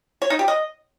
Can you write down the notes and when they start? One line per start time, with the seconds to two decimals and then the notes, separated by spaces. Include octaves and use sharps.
0.22 C#5
0.30 D#4
0.39 G4
0.48 D#5